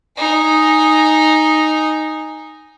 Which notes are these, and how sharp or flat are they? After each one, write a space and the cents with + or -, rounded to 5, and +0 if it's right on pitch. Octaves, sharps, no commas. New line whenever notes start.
D#4 +0 G#5 -5